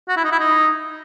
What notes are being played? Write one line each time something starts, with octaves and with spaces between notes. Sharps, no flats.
F#4
E4
D#4
E4
D#4